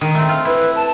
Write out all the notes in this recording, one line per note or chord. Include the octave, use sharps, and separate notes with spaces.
D#3
A3 C4
F4
E4 B4
A5